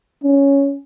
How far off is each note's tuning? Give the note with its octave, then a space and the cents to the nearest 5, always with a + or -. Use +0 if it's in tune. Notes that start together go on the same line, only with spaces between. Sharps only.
C#4 +5